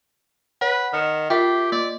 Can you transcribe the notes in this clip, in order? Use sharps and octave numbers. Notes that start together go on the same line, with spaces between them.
B4 C#5 F#5
D#3 F6 C#7 E7
F4 G4 A#4 E5 G5 C#6 B6
A#3 D5